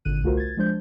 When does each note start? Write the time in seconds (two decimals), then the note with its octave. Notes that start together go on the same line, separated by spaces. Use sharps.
0.05 G#1 A#2 D3 F#6 D#7
0.23 C2 A3 F4 F#4 A#4 C5
0.37 G#6 A6
0.57 F3 G#3 D4 C5 G6